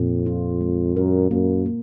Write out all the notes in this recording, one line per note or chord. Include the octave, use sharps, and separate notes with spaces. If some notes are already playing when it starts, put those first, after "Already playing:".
Already playing: F2 A#2 C4
F4
G#3
F#2 A#4
F#2 A#3
A#3